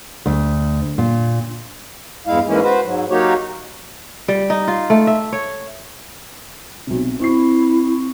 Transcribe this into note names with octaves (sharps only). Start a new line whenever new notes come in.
D2
A#2
E2 G2 G#3 E4 F5
G#2 E3 G#3 A#3 C#4 E4
F#4 B4 C5
G#2 F#3
F#3 A#3 D#4 F#4 G4 C#5
G3
D#4
F4
A3
E5
C#5
B1 C3
C4 E4 C#6 C7